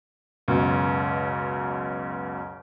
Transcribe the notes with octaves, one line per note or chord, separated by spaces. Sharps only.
C#2 F#2 B2